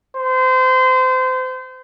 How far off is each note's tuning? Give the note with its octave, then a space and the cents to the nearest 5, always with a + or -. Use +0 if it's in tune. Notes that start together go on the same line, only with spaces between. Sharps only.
C5 -30